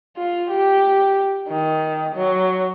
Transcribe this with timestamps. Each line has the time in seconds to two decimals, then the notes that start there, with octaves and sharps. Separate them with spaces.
0.17 F4
0.50 G4
1.49 D#3
2.15 F#3